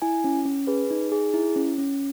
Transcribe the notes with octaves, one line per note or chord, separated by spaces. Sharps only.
E4 G#5
C#4
C#4
G#4 B4
D#4
G#4
E4
C#4
C#4